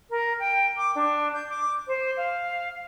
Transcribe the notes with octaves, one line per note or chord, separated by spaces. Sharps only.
A#4
G5
D6
D4
G6
D6
C5
F5